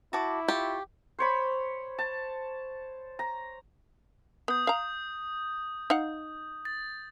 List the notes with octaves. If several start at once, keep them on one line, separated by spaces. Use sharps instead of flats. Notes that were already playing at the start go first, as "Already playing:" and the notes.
E4 F#4 A5 D6
F4 G4 C#6
C5 C#5 B5
A5
A#5
B3 D#6 G6
F5 A#5
D#4 F5 F#5
A6